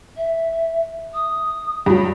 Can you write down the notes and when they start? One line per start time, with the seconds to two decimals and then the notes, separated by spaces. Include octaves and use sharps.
0.17 E5
1.14 D#6
1.86 G2 F#3